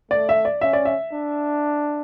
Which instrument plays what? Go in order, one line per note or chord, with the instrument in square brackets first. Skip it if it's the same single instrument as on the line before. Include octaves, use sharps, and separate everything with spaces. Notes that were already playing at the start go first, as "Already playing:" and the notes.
[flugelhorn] A3 [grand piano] D5
[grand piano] E5
D5
[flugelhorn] C#4 [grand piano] E5
[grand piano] D5
E5
[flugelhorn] D4